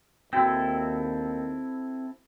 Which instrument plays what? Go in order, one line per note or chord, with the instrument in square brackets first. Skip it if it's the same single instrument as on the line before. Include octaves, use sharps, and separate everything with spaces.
[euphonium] D#2 [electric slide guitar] C4 E4 A4 [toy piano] F#4 G5